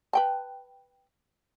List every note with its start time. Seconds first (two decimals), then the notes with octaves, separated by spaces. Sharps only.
0.13 B4 G5 A5